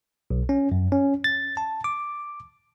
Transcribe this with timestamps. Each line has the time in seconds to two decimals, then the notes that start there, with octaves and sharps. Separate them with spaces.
0.30 B1
0.49 C#4
0.72 F#2
0.92 C#4
1.24 A6
1.57 A5
1.84 D6